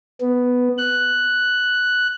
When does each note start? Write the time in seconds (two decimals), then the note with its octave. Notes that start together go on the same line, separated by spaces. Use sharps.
0.20 B3
0.78 F#6